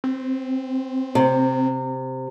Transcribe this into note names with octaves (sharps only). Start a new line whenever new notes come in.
C4
C3